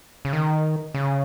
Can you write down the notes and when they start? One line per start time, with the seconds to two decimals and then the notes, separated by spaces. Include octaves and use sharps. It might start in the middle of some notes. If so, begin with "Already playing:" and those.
0.25 C#3
0.33 D#3
0.94 C#3